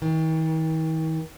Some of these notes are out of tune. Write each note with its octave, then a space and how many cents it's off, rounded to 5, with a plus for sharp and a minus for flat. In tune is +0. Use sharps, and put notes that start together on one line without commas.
D#3 +45